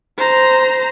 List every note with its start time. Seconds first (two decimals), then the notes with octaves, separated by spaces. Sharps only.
0.18 C5 A#5